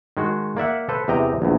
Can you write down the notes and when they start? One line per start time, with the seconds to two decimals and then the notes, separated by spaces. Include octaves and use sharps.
0.17 D#3 G#3 F#4
0.57 A#3 D5 E5 F#5
0.89 A4 B4 C5
1.08 E2 C3 D#5 G5 A#5
1.42 A#1 E2